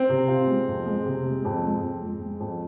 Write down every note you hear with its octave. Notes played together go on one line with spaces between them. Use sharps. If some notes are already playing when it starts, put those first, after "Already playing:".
Already playing: C4
C3
F4
G#3
F2
G#3
C3
G#3
F2
G#3
F2
G#3
G#3
F2